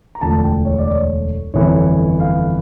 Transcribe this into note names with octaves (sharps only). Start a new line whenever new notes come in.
A#5
E1 D2 D3 F3 A5
A5
G5
C#5
D5
C#5
G1 F2 E3 C#5
F5